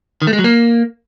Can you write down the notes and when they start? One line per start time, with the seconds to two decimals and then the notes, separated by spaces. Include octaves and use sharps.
0.22 D#3
0.27 A3
0.33 G#3
0.39 F#3
0.44 A#3